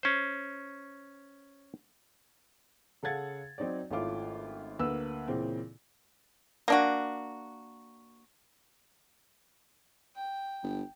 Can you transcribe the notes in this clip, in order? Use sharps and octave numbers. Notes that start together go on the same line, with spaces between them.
C#4 C5
C#3 A4 F5 F#5 G#6 A6
F#3 C4 D#4 C#5 D5
G#1 A3 C#4 E4 F4 D6
D2 A#3 B4 E6
A#2 C#3 E3 C4
A#3 D4 F#4
G5
G1